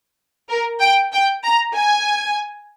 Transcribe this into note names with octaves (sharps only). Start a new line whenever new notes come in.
A#4
G5
G5
A#5
G#5